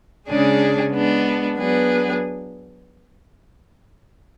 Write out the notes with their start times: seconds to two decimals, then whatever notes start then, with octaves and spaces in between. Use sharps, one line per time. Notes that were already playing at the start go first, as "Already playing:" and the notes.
0.28 C#3 G#3 D4 G#4
0.92 G#3 B3 D4
1.58 F#3 B3 D4 G#4